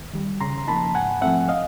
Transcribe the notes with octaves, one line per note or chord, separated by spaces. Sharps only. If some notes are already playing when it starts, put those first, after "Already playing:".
Already playing: D#2
D#3 G3
C#3 A#5 C6
F3 A#3 D#4 A5 B5
G#2 F#5 G#5
F3 A3 C4 E5 F#5
D#5 F5